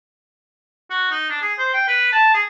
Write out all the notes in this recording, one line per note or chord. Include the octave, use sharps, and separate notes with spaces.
F#4
D#4
D4
G#4
C5
G5
B4
A5
G#4